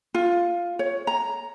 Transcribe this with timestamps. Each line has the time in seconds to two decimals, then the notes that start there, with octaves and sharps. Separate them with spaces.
0.14 F4
0.79 C#5
1.07 A#5